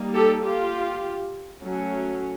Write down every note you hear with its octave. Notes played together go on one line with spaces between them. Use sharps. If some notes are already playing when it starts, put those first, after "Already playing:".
Already playing: G3 A#3 D#4
G4 A4
F4 G4
F#3 A3 C#4